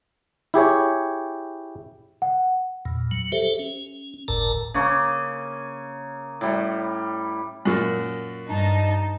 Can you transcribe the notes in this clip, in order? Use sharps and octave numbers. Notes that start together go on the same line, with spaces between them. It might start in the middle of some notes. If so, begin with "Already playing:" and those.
E4 G4 G#4 C#5
F#5
E2 A#2
F#3
G4 A4 C5 E5
C#4
G1 D2 A2 A#4 A5 A#5
C#3 A#3 C#5
A2 G3
F#2 A#2
G2 D#4 A5